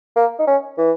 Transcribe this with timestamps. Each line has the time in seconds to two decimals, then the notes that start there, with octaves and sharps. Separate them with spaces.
0.16 A#3
0.39 D#4
0.47 C#4
0.78 E3